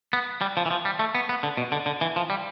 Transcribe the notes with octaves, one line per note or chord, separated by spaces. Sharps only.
B3
G3
F3
E3
F3
G3
A3
B3
B3
D3
B2
D3
D3
E3
F3
G3